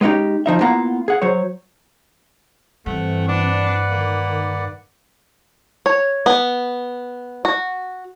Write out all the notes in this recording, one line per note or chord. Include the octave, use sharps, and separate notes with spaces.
G#3 B3 C#4 D#4 G4
F2 F3 D#4 E5
A#3 B3 E4 F4 F#5 A#5
G#4 F#5
F#3 C5 C#5
G2 E3 A3 C4 F#5
D4 B4 D5 F#5
D#3 A#3
C#5
B3
F#4